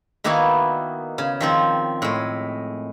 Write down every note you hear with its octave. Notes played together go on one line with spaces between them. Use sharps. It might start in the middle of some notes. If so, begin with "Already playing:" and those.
D#3 A#3 B3 D#4 E4 F#4
C#3
D#3 F3 C4
A2 G#3